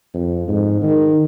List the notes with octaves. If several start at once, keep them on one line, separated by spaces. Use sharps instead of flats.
F2
G#2
D#3